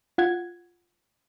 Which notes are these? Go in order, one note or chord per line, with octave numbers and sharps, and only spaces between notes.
F4 F#5 G#6